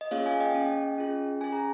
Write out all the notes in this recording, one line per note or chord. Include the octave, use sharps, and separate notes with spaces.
D#5
A#3 C#4 F4 G#4 C#5 F5
F5 G#5
D#5 G5
C#4 G#4
C#4 F4 G#4
C#4 G#4 G#5
A#5